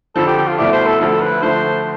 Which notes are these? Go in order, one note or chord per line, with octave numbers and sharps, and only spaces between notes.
F2 D3 F3 A4
G4
G4
F4
C2 B2 A3 E4 D5
C5
A4
D2 D3 F3 A4
B4
D3 F3 A3 C5